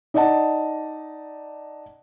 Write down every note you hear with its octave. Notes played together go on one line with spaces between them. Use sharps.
D#4 D5 D#5 F#5 A5